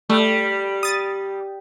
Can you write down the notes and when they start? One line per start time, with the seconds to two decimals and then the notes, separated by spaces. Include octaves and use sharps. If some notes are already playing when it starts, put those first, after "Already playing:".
0.10 G3 A3
0.83 D#6 A6